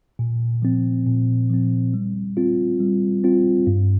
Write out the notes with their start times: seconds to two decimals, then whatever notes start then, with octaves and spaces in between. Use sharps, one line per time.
0.19 A#2
0.62 F3 C4
1.07 A#2
1.50 F3 C4
1.94 G3
2.37 C4 F4
2.80 G3
3.24 C4 F4
3.67 G2